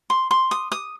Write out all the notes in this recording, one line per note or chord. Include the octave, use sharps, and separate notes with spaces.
C6
C6
D#6
D#6